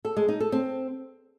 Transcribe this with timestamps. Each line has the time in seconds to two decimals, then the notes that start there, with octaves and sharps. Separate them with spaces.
0.05 A4
0.17 G#3
0.28 D#4
0.40 A4
0.52 C4